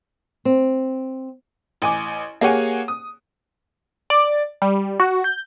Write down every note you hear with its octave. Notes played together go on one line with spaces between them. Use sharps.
C4
A1 G#5 D6
A#3 G4 G#4 C#5 F#5 G#5
D#6
D5
G3
F#4
G6